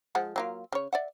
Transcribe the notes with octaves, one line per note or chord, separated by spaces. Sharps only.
F3 G#3 F#5
F#3 A#3 F4
C#3 C#5
D5 E5 F#5